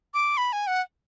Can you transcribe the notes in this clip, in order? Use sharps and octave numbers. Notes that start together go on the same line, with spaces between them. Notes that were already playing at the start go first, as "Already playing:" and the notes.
D6
B5
G#5
F#5